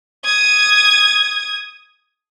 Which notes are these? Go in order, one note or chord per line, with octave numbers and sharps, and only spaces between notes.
D#6 G#6